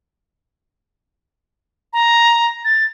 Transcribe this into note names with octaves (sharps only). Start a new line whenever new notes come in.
A#5
A6